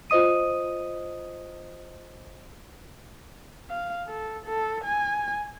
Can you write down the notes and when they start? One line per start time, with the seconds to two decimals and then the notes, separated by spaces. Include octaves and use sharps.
0.10 F4 C5 D#5 D#6 D#7
3.69 F5
4.07 A4
4.45 A4
4.84 G#5